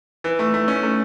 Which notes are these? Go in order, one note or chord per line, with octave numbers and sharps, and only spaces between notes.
E3
A3
A3
C#4
A3